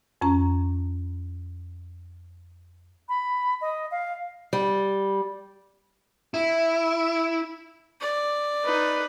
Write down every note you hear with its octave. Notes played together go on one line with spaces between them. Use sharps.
F2 C#4 A#5
B5
D#5
F5
G3
E4
D5
D#4 B4